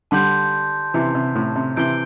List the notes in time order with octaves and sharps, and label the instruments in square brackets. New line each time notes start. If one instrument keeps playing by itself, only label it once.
[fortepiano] D3 G3 [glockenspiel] A5 C6 G6
[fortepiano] C3 E3
C3
A2
C3
[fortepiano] C3 E3 [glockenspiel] G6 D7 G7